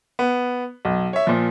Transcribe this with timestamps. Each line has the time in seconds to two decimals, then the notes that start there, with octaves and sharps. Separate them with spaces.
0.19 B3
0.85 B1
1.13 C#5 E5
1.27 A#2 F3